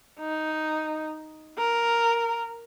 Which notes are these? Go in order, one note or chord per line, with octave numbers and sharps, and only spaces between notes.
D#4
A#4